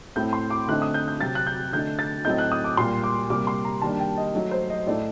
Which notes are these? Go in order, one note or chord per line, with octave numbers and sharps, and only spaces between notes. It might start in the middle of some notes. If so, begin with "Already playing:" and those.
A2 A3 C4 G6
C6
D6
D3 A3 C4 D#4 F#6
D#6
G6
G6
C3 F#3 C4 A6
F#6
G6
D3 A3 D#4 G6
A6
A2 F#3 A3 C4 D#4 G6
F#6
D#6
D6
A#2 G3 A#3 C6
D6
C3 G3 A#3 D6
C6
A#5
D#3 G3 A#3 D4 A5
G5
D#5
F#3 A3 D#4
C5
D#5
A2 A3 D#4 D5